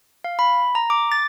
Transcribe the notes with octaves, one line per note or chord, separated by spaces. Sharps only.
F5
B5
A#5
D6
A6